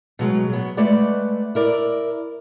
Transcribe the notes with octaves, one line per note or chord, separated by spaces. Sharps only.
B2 F#3 G#3
F#3 B3
G#3 A3 B4 D5 F#5
E4 A#4 D5